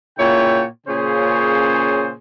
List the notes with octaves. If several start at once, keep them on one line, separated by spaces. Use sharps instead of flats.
A#2 C#3 E4 C#5 G5
A#2 C#3 C#4 G#4 C5 C#5